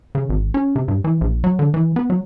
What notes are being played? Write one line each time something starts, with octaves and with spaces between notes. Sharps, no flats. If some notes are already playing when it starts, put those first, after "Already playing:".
C#3
G#1
C#4
C3
G2
E3
A#1
F#3
D3
E3
B3
F#3